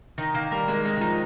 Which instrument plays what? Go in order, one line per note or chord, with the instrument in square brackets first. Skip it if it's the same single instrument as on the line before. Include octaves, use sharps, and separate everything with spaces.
[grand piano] D#3 [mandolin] D#4
[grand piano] D#3 [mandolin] A#3
[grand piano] G3 [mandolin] A#4
[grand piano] G#3 [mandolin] A#3
[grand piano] G#3 [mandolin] D#4
[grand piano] D#3
[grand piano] F3 [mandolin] D#4